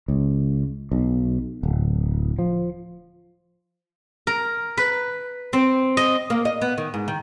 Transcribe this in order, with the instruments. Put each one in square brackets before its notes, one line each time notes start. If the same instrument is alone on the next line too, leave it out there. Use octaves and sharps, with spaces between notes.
[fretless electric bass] C#2
B1
D1
F3
[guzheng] A#4
B4
C4
D#5
[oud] A#3
D#5
B3
D#3
G#2
D#3